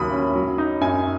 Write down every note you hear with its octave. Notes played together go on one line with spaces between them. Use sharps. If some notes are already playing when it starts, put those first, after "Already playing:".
Already playing: D#2 C#3 F#3 B5 D#6
C#4
F#3
D#4
F#2 G#5